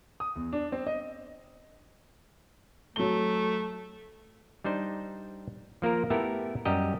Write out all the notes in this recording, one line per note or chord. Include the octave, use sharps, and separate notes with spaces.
D#6
E2
D4
C4
D#5
F#3 A3 G7
G3 D4 D#4 C5
F3 A#3 F4 A#4
A3 B3 E4 G4 A4 A#4
F#2 G3 G4 D#5 A#5